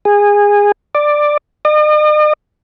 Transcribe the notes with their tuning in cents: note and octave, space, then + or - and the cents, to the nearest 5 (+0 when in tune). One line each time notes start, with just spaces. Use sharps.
G#4 -20
D5 +10
D#5 -45